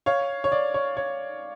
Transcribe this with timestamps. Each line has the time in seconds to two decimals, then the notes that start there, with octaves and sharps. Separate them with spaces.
0.06 C#5 F5
0.44 C#5
0.52 D5
0.74 C#5
0.97 C#5